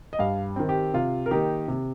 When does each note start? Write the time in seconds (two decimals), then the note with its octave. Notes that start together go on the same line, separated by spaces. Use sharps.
0.13 D#5
0.19 G2 F5
0.56 D#3 C4
0.69 G4
0.94 C3 F4
1.26 A#4
1.31 D#3 A#3 D#4 G4
1.68 C3